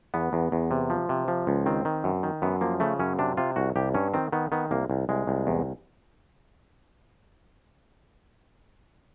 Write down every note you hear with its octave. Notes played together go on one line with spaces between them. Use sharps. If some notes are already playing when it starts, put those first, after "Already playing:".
E2 B3
E2
E2
C3
F3
C3
F3
C#2
D#3 C4
D#3
F#2
D#3
F#2 B3
F3 A#3
C#3 A3
F#2 C#4
C3 D4
C3 F4
C2 F#4
C2 G4
G2 C#4
D#3 C4
D#3 B3
D#3 B3
C2 A#3
C2
C2 G#3
C2
E2